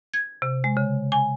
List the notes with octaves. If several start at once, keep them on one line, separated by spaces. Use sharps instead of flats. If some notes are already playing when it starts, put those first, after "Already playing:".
G#6
C3
G#3
C#3
G#5